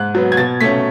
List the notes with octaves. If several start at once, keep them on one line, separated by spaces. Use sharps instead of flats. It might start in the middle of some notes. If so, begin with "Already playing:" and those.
Already playing: G#2 F#6
F#3 B3
G#6
B2 A6
A3 C#4 B6